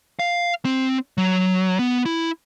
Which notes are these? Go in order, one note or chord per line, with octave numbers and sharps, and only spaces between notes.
F5
C4
F#3
B3
E4